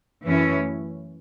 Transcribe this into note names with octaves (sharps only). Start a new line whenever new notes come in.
F#2 E3 A3 C#4